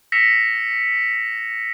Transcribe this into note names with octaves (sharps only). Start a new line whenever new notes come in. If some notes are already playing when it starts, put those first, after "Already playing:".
E6 A#6 B6 C#7 E7 F7